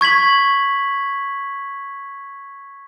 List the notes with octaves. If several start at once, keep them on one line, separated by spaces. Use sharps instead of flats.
C#6 G#6 B6 F#7